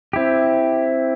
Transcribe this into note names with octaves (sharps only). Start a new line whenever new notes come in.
C4 E4 G4